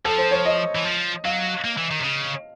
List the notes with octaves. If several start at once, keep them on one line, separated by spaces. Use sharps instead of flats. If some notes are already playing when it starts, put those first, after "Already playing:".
F3 A4
C5
C#5
D#5
E3
F3
F#3 F5
A#3
E3
D#3
C3
C#3